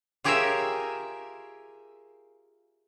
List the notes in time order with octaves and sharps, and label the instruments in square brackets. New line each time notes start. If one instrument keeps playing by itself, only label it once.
[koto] F4 G4 G#4 A#4 C#5 E5